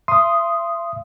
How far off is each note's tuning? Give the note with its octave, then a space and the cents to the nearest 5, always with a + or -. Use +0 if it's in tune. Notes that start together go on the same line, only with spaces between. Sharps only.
E5 +40 C6 +0 D#6 +0